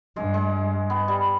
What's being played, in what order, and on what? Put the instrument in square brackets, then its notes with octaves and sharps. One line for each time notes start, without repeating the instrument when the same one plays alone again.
[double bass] G2 [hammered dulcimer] G#3
[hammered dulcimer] G#3
B3
G3